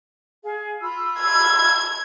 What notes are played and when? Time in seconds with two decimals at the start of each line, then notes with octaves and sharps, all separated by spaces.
0.44 G#4 F5
0.81 F4 B5 E6
1.20 G#6